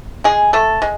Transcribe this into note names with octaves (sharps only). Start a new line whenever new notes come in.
G#3 G#4
A3 A4
G#3